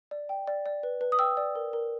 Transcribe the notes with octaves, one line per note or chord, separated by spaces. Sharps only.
D5
G5
D5
D5
B4
B4
D#6
G5 E6
D5
A#4
A#4